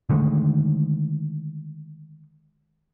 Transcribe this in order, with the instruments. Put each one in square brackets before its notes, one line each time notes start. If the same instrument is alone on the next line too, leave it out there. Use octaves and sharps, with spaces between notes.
[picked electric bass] D3 D#3 G#3 A3